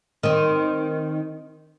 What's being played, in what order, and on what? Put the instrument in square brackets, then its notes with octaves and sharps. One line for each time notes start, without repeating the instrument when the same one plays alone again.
[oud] D#3 C4